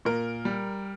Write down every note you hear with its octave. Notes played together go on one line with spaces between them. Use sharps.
A#2 A#4
G3